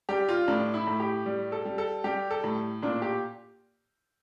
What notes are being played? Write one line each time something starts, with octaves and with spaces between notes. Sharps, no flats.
G3 G4
F4
A2 D4
E4
A2
G4
G3
A4
G3
A4
G3 G4
A4
A2
A#2 D4
G4